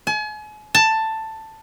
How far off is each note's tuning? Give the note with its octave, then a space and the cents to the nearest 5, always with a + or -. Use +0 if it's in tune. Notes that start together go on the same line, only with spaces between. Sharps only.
G#5 +40
A5 +10